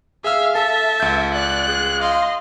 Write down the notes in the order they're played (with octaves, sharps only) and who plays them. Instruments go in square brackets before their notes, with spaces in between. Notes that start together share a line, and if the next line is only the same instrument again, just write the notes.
[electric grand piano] G#4 E6 [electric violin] E5 F5
[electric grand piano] A4 [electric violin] E5 [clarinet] A5
[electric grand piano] C#2 G6
[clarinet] D5 [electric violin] F#6
[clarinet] G#4
[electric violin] D#5 C6 [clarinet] F5